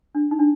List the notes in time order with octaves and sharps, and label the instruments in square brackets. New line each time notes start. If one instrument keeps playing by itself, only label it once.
[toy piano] D4
D#4
D4